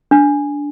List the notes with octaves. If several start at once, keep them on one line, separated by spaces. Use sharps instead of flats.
D4